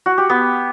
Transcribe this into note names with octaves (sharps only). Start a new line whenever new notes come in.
F#4
G4
B3